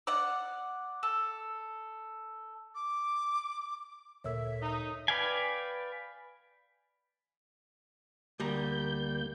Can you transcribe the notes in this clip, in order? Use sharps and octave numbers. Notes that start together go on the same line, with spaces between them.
D5 F#5
A4
D6
D2 A#2 A4 A#4 C#5 E5 E6
D#4
B4 D5 F5 G5 G#5
D2 G3 A#3 A#5 G6